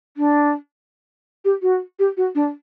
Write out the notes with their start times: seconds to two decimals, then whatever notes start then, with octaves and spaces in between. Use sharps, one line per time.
0.17 D4
1.45 G4
1.62 F#4
1.99 G4
2.17 F#4
2.35 D4